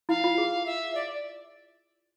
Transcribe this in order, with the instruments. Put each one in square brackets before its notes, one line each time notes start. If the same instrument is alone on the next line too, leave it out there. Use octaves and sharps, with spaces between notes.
[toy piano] E4 [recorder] F5
[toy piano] F4
G#4
[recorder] E5
D5